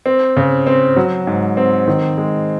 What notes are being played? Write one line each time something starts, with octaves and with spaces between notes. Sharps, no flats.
C4
C#3
C4
F#3
G#2
C4
D#3
G#3